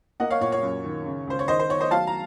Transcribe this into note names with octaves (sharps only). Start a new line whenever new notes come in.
A#3 D#5 F#5
C#5 F5
A#2 C#5
C#5
F#2
D#3
C#3
C#2 C5
C#5
D#3 C5 D#5
C5
D#3 C#5
C5 D#5
F#3 F5 A5
A#5